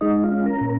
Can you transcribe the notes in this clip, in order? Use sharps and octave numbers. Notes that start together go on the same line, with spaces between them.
G#3 D#4 D#5
F4 F5
C#4
A#4 A#5
A#2